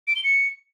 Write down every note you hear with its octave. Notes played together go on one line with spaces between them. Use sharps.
D7
G7
C#7